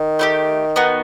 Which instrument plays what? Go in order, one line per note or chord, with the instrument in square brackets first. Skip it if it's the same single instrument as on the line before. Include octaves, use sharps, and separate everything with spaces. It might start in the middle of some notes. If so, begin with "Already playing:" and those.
Already playing: [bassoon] D#3
[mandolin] A3 E4 G4
B3 D#4 F#4